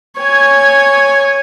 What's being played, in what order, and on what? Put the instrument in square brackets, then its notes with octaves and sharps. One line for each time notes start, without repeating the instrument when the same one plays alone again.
[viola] C#5 G#5